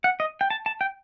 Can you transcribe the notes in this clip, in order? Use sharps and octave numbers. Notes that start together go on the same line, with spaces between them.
F#5
D#5
G5
A5
A5
G5